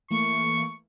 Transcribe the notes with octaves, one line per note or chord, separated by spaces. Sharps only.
E3 A3 A#3 C#6